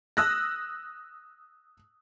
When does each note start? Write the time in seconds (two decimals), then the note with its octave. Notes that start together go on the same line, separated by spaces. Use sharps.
0.17 D#6 E6 F#6 A#6